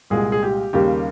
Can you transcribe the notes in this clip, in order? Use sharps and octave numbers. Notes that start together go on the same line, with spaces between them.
C2 A#2 G#3 G#4
G#4
G4
D#2 C#3 G3 A#3 G4